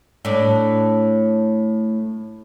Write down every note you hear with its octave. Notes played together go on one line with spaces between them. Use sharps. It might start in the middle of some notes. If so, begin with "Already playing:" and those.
A2 D4